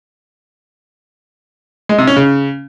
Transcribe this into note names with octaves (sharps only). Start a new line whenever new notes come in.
G#3
C3
C#4
C#3